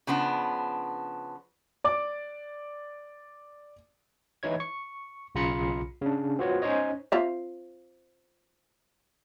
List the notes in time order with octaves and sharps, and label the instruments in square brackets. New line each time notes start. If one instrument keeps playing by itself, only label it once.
[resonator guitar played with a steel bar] C#3 F3 B3 D4
[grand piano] D5 D6
[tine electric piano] E3 D#4 E4 C#5 G#6
C#6
B1 C#3 F4 A#5 B5 C#7
C#3 D4
C4 F4 F#4 B4 C#5
C#4 D#4 C5 C#5 D#5
[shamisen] C4 F4 E5